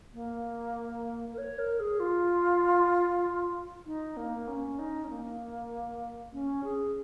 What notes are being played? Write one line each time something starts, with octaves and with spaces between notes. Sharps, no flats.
A#3
A#4
C#5
A#4
G#4
F4
D#4
A#3
C#4
D#4
C#4
A#3
C#4
G#4